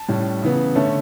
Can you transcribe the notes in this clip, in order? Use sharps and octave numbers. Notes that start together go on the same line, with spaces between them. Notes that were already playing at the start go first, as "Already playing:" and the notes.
Already playing: A5
A2 G3 C#4
C#3 E3 B3
D3 A3 C#4